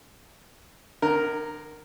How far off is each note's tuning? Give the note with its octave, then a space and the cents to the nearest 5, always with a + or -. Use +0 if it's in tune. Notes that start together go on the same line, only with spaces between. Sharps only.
D3 +40 A#4 +0